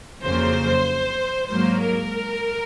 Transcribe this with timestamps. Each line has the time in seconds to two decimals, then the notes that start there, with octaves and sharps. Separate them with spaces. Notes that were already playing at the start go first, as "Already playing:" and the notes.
0.23 F2 C#3 F#3 A#3 C5
1.49 G#2 F#3 A#3 C5
1.80 A#4